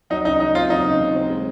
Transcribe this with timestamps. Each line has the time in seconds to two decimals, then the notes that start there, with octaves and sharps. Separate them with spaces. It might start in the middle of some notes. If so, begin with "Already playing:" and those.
0.10 F#3 D#4
0.25 C#3 D#4
0.40 D#2 D#4
0.55 C4 F4
0.70 F#3 D#4
0.85 C#3
1.00 D#2
1.14 C4
1.29 G#3